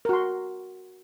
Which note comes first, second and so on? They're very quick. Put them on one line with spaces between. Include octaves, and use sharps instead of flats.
A#4 F#4 C6